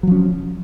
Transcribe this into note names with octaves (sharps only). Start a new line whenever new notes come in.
F3 F#3 C#4